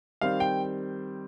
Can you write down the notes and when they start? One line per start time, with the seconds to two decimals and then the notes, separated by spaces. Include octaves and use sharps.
0.21 D#3 G3 C4 F5
0.40 G5